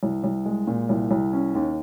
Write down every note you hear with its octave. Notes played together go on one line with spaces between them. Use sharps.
C2
C2
G#3
A#2
C2
C2
C#4
D#2